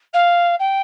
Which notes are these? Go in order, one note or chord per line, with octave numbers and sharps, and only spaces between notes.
F5
G5